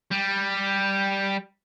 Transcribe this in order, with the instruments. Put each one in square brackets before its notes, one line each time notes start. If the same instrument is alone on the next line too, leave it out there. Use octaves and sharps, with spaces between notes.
[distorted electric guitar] G3